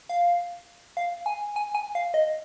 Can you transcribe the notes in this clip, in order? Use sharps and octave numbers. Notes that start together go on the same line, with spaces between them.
F5
F5
G#5
G#5
G#5
F5
D#5